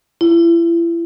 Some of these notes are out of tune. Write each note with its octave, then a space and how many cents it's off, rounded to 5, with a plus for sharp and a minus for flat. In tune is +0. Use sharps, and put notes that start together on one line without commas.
E4 +35